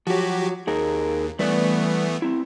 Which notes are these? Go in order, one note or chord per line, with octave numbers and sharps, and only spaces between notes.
F3 F#3 F#4 G4
D#2 D#4 G#4 A#4
E3 G3 A3 B3 B4 D5
C4 E4